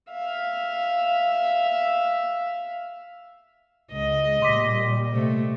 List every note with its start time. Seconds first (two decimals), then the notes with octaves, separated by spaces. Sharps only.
0.12 E5 F5
3.92 C#2 D#5
4.42 A#2 G3 C6 D6 B6
5.13 C3 A3